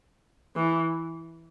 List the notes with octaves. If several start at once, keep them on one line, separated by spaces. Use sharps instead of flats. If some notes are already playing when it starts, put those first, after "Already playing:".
E3